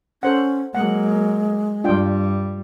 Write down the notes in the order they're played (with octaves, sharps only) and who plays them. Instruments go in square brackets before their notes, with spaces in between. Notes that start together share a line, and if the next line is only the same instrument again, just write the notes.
[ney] C#4 [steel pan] A4 C5 F#5
[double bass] F#3 A#3 [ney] G#3 [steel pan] F#5
[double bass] G2 G3 [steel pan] D4 F4 G5